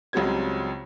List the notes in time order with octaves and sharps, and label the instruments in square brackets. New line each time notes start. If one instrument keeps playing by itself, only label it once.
[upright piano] C#2 C#3 F#3 G3 C4 G#6